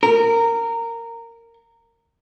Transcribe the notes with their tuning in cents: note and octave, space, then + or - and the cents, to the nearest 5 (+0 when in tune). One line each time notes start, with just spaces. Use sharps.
A#4 -15